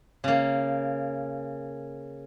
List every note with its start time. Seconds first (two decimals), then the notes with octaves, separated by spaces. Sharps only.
0.24 C#3 A#3